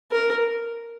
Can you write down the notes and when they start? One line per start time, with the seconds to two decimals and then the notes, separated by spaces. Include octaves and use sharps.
0.12 A#4